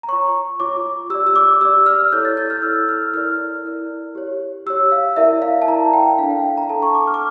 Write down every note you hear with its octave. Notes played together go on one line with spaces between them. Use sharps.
A#5
F4 C#5 C#6
F4 C#5 D6
G4 D5 E6
E6
D6
G4 D5 E6
F6
E4 A4 C#5 G6
A6
G6
F6
E4 A4 C#5 E6
F6
E4 A#4 D5 F6
E4 A#4 D5
G4 C#5
G4 C#5 E6
F5
E4 A#4 D5 E5
F5
A5
E4 A#4 D5 A#5
G5
D4 A4 D5 F5
G5
F5
A#5
D4 A4 D5 A5
C#6
D6
F6
D6